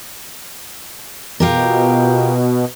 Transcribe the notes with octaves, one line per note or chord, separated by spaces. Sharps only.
B2 F4 G4 A#4